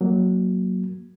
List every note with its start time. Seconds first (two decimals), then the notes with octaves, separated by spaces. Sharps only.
0.01 F#3 A#3